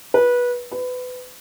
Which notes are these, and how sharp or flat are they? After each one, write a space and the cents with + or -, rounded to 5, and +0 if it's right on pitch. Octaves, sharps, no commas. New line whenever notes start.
B4 -20
B4 +25